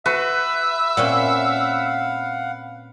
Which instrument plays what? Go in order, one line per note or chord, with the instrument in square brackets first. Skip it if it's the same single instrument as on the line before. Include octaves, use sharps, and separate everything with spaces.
[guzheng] F#4 [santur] B4 [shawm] E5
[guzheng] A#2 C4 C#4 [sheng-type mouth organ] F5 F#5